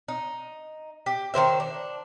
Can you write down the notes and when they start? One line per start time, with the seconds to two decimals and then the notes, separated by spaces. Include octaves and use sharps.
0.08 D#4
1.06 G4
1.34 D#3 E3 C5 E5
1.60 D4